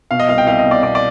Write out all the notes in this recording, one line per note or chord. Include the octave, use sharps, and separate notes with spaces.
B2 F5
D#5
C2 F5
G5
C2 F5
D#5
B2
D5
B2 D5
D5